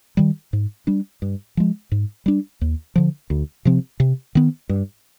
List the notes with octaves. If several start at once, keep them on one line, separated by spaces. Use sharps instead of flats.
D#3 G3
G#2
G3 D4
G2
F3 G#3
G#2
G3 D4
D#2
D3 F3
D2
C3 F3 C4
C3
D#3 B3
G2